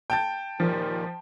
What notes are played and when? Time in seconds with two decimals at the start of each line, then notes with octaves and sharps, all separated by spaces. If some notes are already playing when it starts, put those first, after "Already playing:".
0.10 G5 A5 G6
0.60 D#2 A#2 D#3 F3